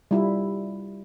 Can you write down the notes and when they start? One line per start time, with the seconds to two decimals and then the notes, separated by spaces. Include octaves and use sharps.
0.11 G3 E4 F4